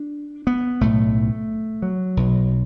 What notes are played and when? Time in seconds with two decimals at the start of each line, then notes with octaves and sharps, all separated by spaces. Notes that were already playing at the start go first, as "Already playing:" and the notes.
Already playing: D4
0.47 B3
0.81 B1 A2 A3
1.82 F#3
2.17 B1 B2